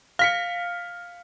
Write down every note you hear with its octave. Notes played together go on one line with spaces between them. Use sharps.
F5 F6 B6 C#7